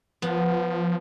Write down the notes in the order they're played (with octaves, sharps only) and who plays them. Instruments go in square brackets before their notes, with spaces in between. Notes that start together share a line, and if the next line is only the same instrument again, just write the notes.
[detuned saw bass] F3 [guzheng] B3